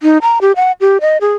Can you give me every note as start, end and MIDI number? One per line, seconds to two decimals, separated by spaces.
0.03 0.18 63
0.22 0.39 82
0.41 0.52 67
0.56 0.72 78
0.81 0.98 67
1.01 1.18 75
1.21 1.35 68